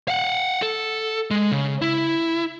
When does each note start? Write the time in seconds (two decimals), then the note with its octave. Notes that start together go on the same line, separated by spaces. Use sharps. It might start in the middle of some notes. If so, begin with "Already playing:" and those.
0.08 F5 F#5
0.62 A4
1.31 G#3
1.52 C#3
1.82 E4